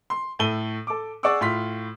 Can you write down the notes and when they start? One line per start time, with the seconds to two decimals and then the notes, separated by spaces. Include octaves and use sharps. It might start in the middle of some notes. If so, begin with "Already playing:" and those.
0.10 C6
0.39 A2 A4 D#7 G7
0.87 A4 D6
1.23 G#4 D5 F#5 C#6 D6 E6
1.41 A2 F4 C6 B6